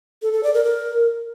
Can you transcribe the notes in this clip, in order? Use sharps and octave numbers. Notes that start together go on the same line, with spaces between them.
A4
A4
D5
A#4
A#4